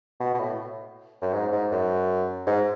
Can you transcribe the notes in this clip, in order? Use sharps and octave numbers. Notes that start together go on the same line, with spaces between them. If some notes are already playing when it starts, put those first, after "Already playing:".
B2
B2
A2
F#2
G#2
G#2
F#2
G#2